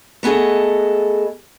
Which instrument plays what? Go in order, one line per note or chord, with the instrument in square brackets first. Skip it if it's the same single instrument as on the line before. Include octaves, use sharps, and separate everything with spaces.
[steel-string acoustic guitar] A3 B3 G#4 A4 D#5